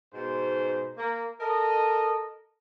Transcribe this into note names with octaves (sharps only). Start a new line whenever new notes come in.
G#2 B2 C5
A#3
A4 A#4 D#5